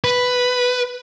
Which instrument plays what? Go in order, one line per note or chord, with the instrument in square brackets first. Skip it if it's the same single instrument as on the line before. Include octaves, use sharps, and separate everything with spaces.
[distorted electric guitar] B4